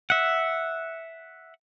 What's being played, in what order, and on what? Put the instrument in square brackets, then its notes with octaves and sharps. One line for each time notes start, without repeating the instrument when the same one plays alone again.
[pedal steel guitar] E5 F#5